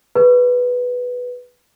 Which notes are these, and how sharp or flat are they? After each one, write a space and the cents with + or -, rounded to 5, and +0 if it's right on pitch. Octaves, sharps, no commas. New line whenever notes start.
G#4 +0 B4 +0